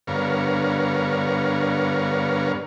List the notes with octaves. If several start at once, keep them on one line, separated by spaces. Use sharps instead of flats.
G2 D3 B3 A#4 C#5 F5